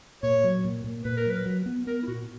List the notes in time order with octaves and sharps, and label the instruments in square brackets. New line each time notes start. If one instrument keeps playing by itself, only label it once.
[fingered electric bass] A#2 [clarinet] C#5
[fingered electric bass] F#3
A#2
A#2
[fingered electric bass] A#2 [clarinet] B4
[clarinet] A#4
[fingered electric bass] F#3 [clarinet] B4
[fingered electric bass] F#3
B3
[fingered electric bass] B3 [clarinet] A#4
[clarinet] E4
[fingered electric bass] A#2 [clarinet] F#4